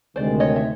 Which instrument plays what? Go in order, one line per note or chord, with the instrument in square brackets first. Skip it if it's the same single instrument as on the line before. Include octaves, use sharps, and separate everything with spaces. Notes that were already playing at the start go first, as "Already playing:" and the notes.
[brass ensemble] D2 C3 D#3 G#3 [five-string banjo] C5 D5
[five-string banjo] C#5 D#5
E5